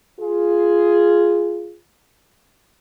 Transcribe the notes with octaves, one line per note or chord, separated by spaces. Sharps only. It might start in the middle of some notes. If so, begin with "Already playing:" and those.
F4 G#4